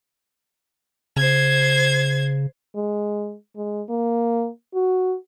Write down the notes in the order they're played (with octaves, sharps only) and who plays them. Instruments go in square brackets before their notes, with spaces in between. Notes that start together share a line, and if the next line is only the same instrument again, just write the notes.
[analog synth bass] C#3 [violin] C5 G#6
[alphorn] G#3
G#3
A#3
F#4